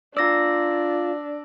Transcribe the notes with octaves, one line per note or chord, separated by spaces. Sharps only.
D4 F4 D5 E6 A#6